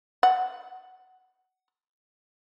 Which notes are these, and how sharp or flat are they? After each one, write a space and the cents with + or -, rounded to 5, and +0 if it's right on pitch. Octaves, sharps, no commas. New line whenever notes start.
F#5 +10